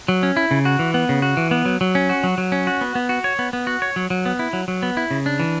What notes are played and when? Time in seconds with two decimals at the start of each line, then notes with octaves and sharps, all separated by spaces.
0.08 F#3
0.23 C#4
0.37 E4
0.51 C#3
0.65 F#4
0.79 E3
0.94 B3
1.09 C#3
1.22 F#4
1.37 E3
1.51 B3
1.65 F#3
1.81 F#3
1.95 C#4
2.09 F#4
2.24 F#3
2.38 F#3
2.52 C#4
2.67 F#4
2.81 B3
2.95 B3
3.09 F#4
3.24 C#5
3.39 B3
3.53 B3
3.67 F#4
3.82 C#5
3.96 F#3
4.10 F#3
4.26 B3
4.39 E4
4.53 F#3
4.68 F#3
4.83 B3
4.97 E4
5.11 C#3
5.26 D4
5.40 E3